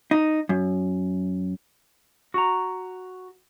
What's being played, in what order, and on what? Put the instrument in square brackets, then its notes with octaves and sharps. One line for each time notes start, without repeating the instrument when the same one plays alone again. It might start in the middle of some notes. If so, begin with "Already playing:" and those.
[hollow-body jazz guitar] D#4
F#2
[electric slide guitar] F#4 A#5